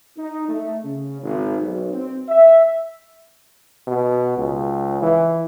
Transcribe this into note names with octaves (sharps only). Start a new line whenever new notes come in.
D#4
A3
C#3
G#1
B1
C4
E5
B2
C#2
E3